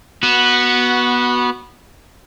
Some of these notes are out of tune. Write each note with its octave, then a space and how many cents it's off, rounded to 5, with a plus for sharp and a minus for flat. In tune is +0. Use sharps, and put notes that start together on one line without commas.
B3 -15 F#4 +0